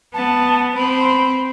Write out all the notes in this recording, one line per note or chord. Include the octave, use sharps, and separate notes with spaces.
B3 A5
C4 B5